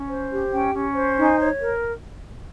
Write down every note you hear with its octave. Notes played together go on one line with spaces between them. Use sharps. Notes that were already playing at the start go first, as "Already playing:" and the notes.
Already playing: C#4
C5
G4
C#4 G5
C#4
C5
D#4 G#5
C#5
A#4